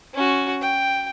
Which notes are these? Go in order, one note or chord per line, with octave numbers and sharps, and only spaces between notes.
C#4 F#4
G5